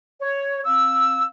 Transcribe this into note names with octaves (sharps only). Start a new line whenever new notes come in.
C#5
C4 F5 E6